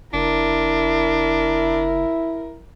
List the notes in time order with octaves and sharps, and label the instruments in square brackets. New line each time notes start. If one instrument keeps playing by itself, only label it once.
[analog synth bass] F#1 [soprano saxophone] D4 [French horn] E4 [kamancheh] A#4